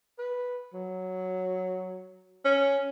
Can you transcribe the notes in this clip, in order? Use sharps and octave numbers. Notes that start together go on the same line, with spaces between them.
B4
F#3
C#4